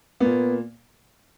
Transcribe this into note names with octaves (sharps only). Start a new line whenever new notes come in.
A#2 A#3 B3